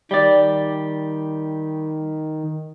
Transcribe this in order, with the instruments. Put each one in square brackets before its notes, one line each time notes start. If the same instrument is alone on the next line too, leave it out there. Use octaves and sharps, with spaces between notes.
[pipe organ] D#3 [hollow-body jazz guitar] G3 D5